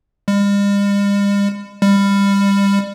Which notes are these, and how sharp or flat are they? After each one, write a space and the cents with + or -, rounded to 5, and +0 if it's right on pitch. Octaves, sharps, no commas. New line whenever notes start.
G3 +45
G3 +25